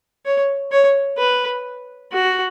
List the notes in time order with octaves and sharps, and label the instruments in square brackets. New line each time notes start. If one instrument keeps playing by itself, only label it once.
[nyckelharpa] C#5
C#5
B4
F#4